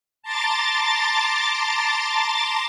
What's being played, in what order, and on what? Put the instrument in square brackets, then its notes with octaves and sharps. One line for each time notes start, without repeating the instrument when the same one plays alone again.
[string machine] A5 A#5 C6 D6 A6